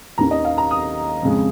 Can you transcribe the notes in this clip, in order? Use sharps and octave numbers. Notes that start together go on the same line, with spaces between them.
D#2 D#3 C#4 A#5
D#5
F5
A#5
D#6
F2 C#3 G#3